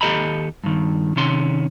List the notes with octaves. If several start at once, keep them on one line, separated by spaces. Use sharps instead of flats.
D#2 G4 A4 D#5 A#5 B5
G2 D#3
C3 D#3 C#4 C6